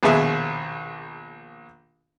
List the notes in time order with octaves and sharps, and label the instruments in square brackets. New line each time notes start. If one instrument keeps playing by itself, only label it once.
[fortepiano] A#1 D#2 B2 B3 G#4 E5